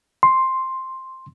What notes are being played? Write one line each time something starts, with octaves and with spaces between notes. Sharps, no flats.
C6